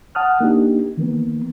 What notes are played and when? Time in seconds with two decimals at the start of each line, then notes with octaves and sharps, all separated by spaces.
0.15 F#5 A5 D#6 F6 F#6
0.40 A#3 D4 D#4 G4
0.97 D#3 E3 A#3 B3